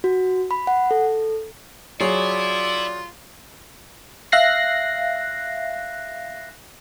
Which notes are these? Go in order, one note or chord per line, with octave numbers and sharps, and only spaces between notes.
F#4
B5
F#5
A4
F#3 E4 F4 G#4 C#5 D5
E5 F5 F#6 A#6 C7